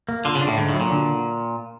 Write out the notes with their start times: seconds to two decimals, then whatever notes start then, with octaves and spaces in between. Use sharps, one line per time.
0.09 A#3
0.25 D3 F4
0.35 C#3
0.41 D4
0.47 A2
0.57 G#2 D3
0.69 A2
0.74 F#3
0.80 A#2
0.91 D3